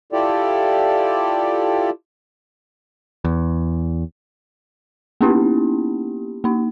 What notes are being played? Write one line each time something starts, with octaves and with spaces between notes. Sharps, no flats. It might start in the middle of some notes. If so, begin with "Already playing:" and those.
E4 F4 G4 A4 D5
E2
A#3 B3 C#4 D#4 E4 G4
A#3 D#4